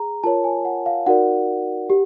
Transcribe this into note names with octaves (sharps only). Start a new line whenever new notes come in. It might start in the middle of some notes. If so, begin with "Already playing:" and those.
Already playing: G#4 A#5
F4 A#4 C#5 A5
G#5
F#5
F5
D#4 F#4 A#4 D5 F#5
G4